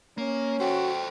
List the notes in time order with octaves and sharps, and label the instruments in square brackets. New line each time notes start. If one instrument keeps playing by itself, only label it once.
[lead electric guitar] A#3 [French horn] C#4
[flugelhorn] F#4 [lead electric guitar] A4 C5 [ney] G5